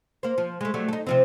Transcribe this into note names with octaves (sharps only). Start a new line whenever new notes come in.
A#3 C5
F3
G#3 A3
F#3 G3 A3
D#4 A4
C3 F3 C4